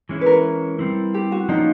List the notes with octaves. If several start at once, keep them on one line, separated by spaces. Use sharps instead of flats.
E3 G#3 C#4 E4
A#4 B4
G3 C4 E4
G4
F#4
F3 A#3 C#4 D#4 F4